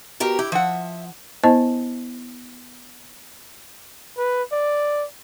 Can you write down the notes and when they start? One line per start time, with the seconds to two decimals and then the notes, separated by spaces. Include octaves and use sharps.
0.20 B2 G4 A#4
0.39 E4 G4
0.52 F3 E5 F#5
1.44 B3 E4 C5 D#5 A5
4.18 B4
4.52 D5